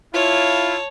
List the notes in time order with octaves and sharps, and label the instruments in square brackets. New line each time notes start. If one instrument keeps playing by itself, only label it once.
[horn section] E4 F4 [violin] C#5 A5